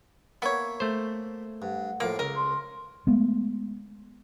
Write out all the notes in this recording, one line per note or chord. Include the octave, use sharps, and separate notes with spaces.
A#3 B3 C#5 E5
A3 C5
G2 F#5
A2 F3 A#3 D6
C#2 A#4
C6
G#3 A3 B3